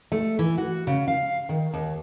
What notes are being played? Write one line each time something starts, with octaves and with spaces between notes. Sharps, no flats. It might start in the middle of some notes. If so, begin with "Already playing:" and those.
A3
E3
F#4
C#3
F5
D#3
D#2